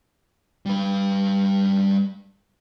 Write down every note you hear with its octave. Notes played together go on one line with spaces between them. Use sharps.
G3 B4